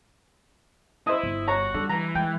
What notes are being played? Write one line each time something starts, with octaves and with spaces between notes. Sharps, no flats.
E4 C5 D#5
G1
F#4 C#5 A#5
D3 G3
E3 A#5
G#3 G5